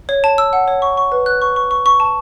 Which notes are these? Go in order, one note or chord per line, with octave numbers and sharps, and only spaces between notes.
C#5
A5
E6
F#5
C#5
C#6
C#6
B4
F#6
C#6
C#6
C#6
C#6
A5